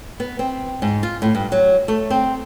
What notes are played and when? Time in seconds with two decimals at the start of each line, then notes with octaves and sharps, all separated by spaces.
0.20 B3
0.39 C4
0.82 G#2
1.03 F4
1.22 A2
1.35 G2
1.52 F#3
1.88 A3
2.10 C4